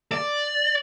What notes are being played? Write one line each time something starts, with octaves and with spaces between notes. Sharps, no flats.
D5